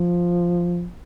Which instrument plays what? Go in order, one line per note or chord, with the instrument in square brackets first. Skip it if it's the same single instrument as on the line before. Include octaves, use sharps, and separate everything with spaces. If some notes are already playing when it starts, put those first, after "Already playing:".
Already playing: [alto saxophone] F3